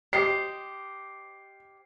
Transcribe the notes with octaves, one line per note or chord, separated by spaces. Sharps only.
G4 C5 D#5 C7